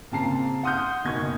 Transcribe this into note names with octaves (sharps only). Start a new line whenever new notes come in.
A#2 C#3 C4 A5 A#5 C7
F#5 C6 D#6 F6 G6
F#1 B2 D#4 C#6 G#6